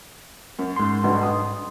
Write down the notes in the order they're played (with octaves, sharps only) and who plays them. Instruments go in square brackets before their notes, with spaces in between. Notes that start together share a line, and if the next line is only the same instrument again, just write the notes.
[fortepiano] F#2
[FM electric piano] G#2 C6
[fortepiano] B1 G2 B2
D#6